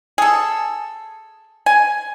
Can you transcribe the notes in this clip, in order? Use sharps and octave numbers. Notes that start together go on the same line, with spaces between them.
G#4 A4
G#5